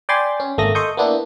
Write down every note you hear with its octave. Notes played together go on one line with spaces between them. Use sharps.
D5 G5 G#5 B5 C6 A6
C#4
G#1 A3 A#3 D#6 A#6
A4 D#5 C6 C#6 D#6 G6
A#3 B3 D4 E4